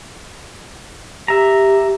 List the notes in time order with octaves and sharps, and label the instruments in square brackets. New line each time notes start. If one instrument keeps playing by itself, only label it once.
[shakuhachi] G4 [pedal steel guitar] E5 A#5